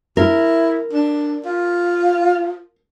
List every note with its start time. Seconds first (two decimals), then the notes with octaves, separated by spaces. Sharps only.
0.17 E4 A#4
0.93 D4
1.45 F4